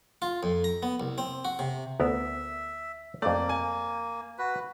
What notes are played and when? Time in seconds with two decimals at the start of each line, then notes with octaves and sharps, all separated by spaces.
0.22 F4
0.43 F2
0.64 A#5
0.83 B3
1.00 C2
1.18 C4
1.45 F#4
1.59 C3
2.00 D2 B3 A#4 E5
3.22 F2 A3 A#3 D5
3.49 G#5
4.39 F#4 B4